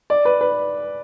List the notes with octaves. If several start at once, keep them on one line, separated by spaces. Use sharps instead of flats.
D5
B4
B4